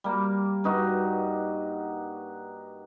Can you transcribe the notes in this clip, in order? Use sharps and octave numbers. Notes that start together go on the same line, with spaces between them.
G3 A#3
G2 D#4 F#4 G4